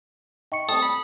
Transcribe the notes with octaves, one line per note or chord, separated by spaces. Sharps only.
D#4 G5 C#6 C#7
A2 G3 C4 A4 A5 D#6
B5